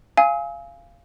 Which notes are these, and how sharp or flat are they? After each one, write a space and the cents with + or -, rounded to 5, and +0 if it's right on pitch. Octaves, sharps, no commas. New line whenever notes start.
F5 -20 G#5 +0 E6 -45